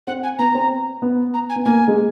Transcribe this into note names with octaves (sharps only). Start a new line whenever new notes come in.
C4 F#5
G#5
B3 A#5
C4
B3
A#5
G#5
B3
A#3 G#5
G#3